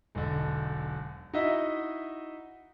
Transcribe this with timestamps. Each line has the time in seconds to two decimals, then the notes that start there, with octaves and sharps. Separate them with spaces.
0.15 E1 B1 D3
1.34 D#4 E4 F#4 D#5 E5